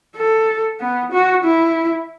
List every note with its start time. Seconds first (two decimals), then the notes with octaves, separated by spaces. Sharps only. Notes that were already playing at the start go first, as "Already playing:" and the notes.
0.16 A4
0.80 B3
1.12 F#4
1.44 E4